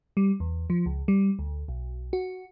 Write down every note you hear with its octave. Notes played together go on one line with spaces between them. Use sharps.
G3
E2
F3
C#2
G3
D2
B1
F#4